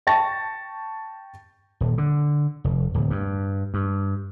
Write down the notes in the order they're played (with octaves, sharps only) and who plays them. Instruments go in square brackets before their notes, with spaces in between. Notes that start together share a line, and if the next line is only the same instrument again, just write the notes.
[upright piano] G5 A5 C#6 A6 A#6
[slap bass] D#1
D3
F1
D1
G2
G2